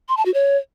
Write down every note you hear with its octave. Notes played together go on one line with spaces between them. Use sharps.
C6
A5
F#4
C#5